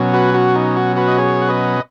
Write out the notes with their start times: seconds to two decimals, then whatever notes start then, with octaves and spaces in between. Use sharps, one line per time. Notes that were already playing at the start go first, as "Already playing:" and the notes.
Already playing: B2 F#3 C#4
0.14 F#4 B4
0.34 F#4
0.55 D#4
0.77 F#4
0.96 F#4 B4
1.08 D#5
1.18 G#4 C#5
1.42 F#5
1.48 B4 D#5